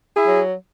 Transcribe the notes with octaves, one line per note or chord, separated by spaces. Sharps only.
E4 G#4
F#3